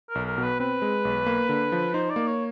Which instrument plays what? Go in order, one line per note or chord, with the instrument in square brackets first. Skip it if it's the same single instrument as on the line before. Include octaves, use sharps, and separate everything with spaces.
[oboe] A#4
[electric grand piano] B1
[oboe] A#4
[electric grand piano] B2
[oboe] B4
[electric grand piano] C4 [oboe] B4
[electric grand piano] G#3
B1
A#3
D3
F3
[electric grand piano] D#4 [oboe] C5
[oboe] D5
[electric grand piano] A#3
[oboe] C#5